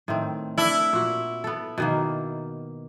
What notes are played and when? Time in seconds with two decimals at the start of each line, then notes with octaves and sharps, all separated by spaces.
0.08 A2 D#3 C4
0.58 D4 E4 A4
0.93 A#2 F#4
1.44 B3 A4
1.78 B2 D#3 A#3